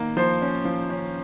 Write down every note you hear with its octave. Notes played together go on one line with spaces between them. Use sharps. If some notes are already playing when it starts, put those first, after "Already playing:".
Already playing: D#3 A#3
F3 C5
C#4
F3
C#4